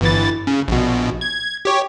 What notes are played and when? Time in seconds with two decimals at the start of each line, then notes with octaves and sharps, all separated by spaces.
0.01 G1 E3 A6
0.47 C#3
0.68 A#1 B2
1.21 G#6
1.65 G4 C#5